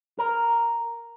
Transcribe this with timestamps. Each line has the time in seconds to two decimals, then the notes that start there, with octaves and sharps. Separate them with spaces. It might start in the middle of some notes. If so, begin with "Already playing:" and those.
0.19 A#4